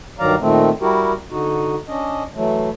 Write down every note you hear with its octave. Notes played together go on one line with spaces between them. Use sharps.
G2 D#3 F#3 D5 F5 A#5
A#2 D#3 A3 C4
G3 E4 F#4 G4 A#4
D3 D#4 F#4
C#4 D4 D#5
E3 F#3 A3